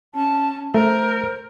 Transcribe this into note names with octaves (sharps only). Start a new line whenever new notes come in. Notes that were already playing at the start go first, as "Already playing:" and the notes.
C#4 A5
A3 A#4 C5